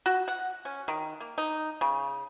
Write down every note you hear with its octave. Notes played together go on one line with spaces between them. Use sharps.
F#4
F#5
C#4
D#3
A#3
D#4
C#3